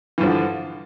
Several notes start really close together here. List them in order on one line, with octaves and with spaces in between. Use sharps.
E3 G2 F3 D3